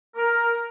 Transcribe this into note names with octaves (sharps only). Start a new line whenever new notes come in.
A#4